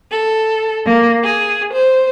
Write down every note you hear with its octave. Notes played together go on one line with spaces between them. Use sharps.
A4
A#3
G#4
C5